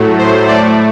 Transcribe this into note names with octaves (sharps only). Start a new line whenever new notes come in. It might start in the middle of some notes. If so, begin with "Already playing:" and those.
Already playing: A2 F#3 A3
C5
A2 A3 D5